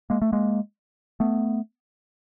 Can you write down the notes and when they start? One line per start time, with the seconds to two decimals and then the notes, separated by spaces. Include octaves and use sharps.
0.10 G#3 A#3
0.22 A3
0.32 G#3 A#3
1.20 A3 B3